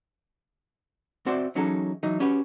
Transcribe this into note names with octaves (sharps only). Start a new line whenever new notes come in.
C4 F#4 C5 D5 E5
E3 F#3 C#4 D#4 G#4 A4
E3 F#3 D#4
C#4 F#4 G4 B4